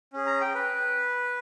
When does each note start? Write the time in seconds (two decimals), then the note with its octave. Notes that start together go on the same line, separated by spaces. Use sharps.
0.13 C#4 G#4
0.27 A#5
0.41 G5
0.55 B4